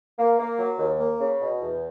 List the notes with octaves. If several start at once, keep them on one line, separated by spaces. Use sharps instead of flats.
A#3
A#3
F#3
D#2
A#3
C#3
B2
E2